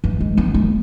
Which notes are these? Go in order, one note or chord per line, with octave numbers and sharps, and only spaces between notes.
E3
G#3
B3
A#3